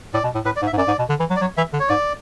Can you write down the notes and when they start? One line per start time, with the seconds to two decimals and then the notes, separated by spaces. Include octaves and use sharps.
0.14 A2 D5
0.24 B2
0.35 A2
0.45 A2 B4
0.56 D5
0.62 G#2
0.67 E5
0.73 G#2
0.77 F#2 D5
0.88 G#2
0.99 B2
1.09 D3
1.20 E3
1.30 F#3
1.36 D5
1.41 F#3 C#5
1.57 E3 E5
1.73 D3
1.80 C#5
1.89 G#2 D5